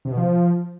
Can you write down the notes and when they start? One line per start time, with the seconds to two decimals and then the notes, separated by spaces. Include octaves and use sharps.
0.05 C3
0.11 B2
0.17 F3